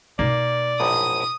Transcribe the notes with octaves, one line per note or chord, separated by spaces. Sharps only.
B2 A#3 D#4 D5
A#1 F#2 A2 D#6 D#7